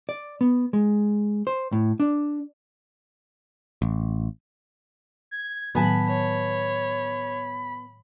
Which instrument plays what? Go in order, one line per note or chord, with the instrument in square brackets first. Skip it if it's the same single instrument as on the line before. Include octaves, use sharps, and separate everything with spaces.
[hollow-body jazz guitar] D5
B3
G#3
C5
A2
D4
[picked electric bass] A1
[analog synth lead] G#6
[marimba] A2 D#3 F#3 [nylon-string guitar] B3 G#5 A5 [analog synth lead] B5
[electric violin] C#5